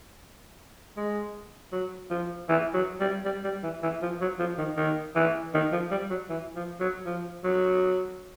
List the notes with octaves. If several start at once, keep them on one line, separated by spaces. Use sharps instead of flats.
G#3
F#3
F3
E3
F#3
G3
G3
G3
E3
E3
F3
F#3
F3
D#3
D#3
E3
D#3
F3
G3
F#3
E3
F3
F#3
F3
F#3